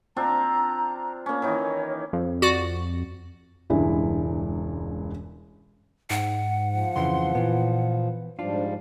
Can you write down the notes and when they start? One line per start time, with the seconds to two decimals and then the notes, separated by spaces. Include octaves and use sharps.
0.16 C4 D4 F4 A#5
1.26 A#3 C#4
1.42 D#3 E3 D#4 C#5
2.13 F2
2.42 F#4 D5
3.70 E1 C#2 G2 G#3 E4
6.10 G#2 F#5
6.71 F3
6.96 F2 C#3 E3 C6
7.35 A#2 E3 B3
8.39 G#2 F3 G3 D4 F4